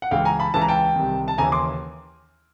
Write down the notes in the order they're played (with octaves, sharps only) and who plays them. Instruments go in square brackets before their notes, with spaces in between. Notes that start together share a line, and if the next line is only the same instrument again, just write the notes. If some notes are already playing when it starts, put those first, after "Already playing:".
[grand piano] F#5
C#2 C#3 E3 F5 G5
G#5 A#5
A5 B5
C#2 C#3 E3 A5
A#5
G5 A5
C2 C3 D#3
A5
D#2 C#3 E3 G#5 A#5
C6 D6